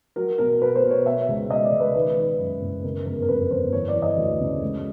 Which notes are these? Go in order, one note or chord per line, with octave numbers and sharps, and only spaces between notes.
F#3 A#4
B2 A#4
B2 B4
C5
B2
C#5
B2 E5
C#2
B2 D#5
D5
C#2
B4
D#3 B4
D#3
F#2
F#1
C#3 A#4
G1 A#4
A#4
F2 B4
G1 C5
E3 C#5
D5
E3
D#5
D2
C#3
G#3